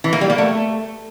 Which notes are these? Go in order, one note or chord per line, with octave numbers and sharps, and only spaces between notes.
E3
A#3
G3
A#3
A3